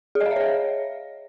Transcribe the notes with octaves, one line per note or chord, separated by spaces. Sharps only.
G#4
D#5
F5
E5
C#5